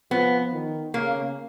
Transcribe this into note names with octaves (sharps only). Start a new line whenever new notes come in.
F3 B3
D#3
C#3 A#3